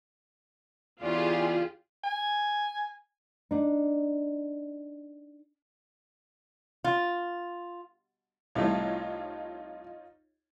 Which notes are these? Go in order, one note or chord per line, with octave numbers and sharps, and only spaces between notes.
E2 C#3 F4 G4 G#4 D5
G#5
D4 D#4
F4
C2 A2 D#4 F4 C#5